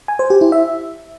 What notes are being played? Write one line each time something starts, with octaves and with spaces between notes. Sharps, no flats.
G#5
C5
G4
E4
E5